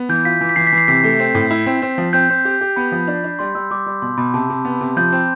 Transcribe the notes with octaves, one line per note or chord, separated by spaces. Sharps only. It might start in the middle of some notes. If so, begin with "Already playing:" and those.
Already playing: B3
E3 G6
F4 B6
E3
B6
E3 C7
B6
E3
C7
C3 B6
A3
C4
A2
E4
C4
C4
F3
C4 G6
C4
G4
G4
B3 B5
F3
D4
D4
G3 C6
G3 E6
G3 D6
G3
B2 C6
B2 B5
C3 A5
C3
B3
C3
F3 G6
C4